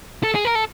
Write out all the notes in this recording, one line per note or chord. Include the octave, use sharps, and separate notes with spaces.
A4
G#4
A#4
A4